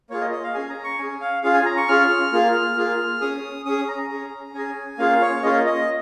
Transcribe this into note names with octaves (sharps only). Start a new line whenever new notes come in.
A#3 F4 G#4 C#5
D#5
D#5
F5
C#4 G#4 G#5
A#5
C#6
C#4 G#4 G#5
F5
C#4 F4 G#4 F5
G#5
A#5
C#6
C#4 F4 G#4 F6
A#3 F4 G#4
A#3 F4 G#4
C#4 G#4 D#6
C#4 G#4 D#6
A#5
C#4 G#4
C#4 G#4 G#5
A#3 C#4 F4 G#4 F5
C#5
A#3 C#4 F4 G#4 D#5
D#5